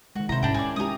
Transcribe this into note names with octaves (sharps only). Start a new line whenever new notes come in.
D#3 G#3 F#4
C3 E4 C5 A#5
G#2 C#4 D4 G5
G#4 D5
G#3 D#4 G4 A#5 D#6